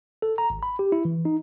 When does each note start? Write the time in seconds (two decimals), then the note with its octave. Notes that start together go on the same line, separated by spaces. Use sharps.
0.22 A4
0.38 A#5
0.50 G#1
0.63 B5
0.79 G4
0.92 E4
1.05 E3
1.25 D#4